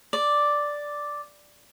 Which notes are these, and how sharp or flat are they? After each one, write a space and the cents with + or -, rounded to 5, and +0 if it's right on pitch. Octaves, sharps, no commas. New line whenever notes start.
D5 +0